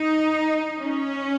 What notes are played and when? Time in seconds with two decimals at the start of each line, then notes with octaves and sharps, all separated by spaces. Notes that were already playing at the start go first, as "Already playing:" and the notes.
Already playing: D#4
0.82 C#4